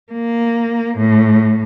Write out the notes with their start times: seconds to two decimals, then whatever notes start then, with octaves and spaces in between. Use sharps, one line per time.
0.12 A#3
0.97 A2